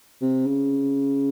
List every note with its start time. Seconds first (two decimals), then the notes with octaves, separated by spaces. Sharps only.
0.21 C3
0.46 C#3